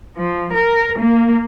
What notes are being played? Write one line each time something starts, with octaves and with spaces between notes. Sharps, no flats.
F3
A#4
A#3